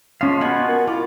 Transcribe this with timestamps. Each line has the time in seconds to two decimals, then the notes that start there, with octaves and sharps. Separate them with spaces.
0.21 F3 G#3 C#4 F4 F5
0.41 B2 B3 F#5 G#5 B5
0.67 A#4
0.87 E4 F4 D6